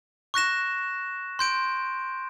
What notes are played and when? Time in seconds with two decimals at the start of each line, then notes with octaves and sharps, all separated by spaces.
0.34 C#6 F#6 A#6 E7
1.39 C6 G6 D7